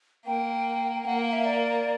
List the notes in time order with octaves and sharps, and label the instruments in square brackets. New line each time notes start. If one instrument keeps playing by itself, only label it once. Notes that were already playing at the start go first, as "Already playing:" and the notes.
[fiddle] A#3 [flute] G5
[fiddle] A#3 [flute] F#5
[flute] F5
E5
D5